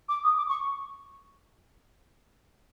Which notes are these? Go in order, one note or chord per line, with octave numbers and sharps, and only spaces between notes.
D6
D#6
D6
C#6